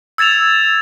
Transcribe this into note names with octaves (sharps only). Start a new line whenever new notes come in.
E6 G#6 A6 E7 F7